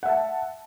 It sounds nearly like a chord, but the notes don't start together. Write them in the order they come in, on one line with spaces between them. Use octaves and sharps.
F#5 E5 A5